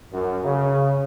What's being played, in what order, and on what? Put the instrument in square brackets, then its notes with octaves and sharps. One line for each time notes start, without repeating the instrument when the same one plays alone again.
[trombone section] F#2
C#3